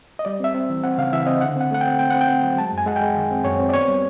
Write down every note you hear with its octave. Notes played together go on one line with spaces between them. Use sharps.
D#5
G3 D5
C4 E5
C4
E3
C4 F#5
C#3 F5
E3 E5
C4 D#5
D3 F#5
C4 F#5
A3 F#5
G5
C4
C4 G5
C4 F#5
G5
C4
F#3
G#3 A5
F#2 G#5
G#3 F#5
G5
G#3
D#3
C4
F#2 C#5
C4
D5
B3 C#5
G3